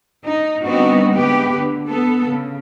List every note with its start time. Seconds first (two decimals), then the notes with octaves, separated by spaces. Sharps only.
0.25 D#4
0.65 D3 G3 B3 C4 D#4 F#4
1.12 D2 G#3 B3 G4 B4
1.53 D3
1.87 B3 A4
2.26 C#3